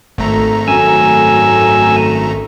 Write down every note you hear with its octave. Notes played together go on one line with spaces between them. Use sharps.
G#1 A3 A#5
F#2 G#5 E6